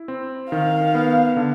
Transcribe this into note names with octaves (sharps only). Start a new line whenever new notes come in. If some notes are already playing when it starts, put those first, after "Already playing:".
Already playing: E4
C4
D#3 F5
B3
D3